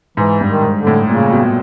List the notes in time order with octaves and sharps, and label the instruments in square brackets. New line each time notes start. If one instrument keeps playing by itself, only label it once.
[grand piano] G#2 [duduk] E3
[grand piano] G2
[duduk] D#3
[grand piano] G#2
[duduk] D3
[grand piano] A2
[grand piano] A#2 [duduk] C#3
[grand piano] B2